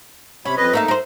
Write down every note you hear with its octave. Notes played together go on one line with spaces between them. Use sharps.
C3 C#4 B5
F2 B4 D#5
A3 A#3 D#4 E5
A#4 C5